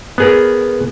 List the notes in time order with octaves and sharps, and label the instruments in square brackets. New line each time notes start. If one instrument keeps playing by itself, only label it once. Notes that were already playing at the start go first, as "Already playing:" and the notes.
[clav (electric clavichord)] B3 G#4 A#4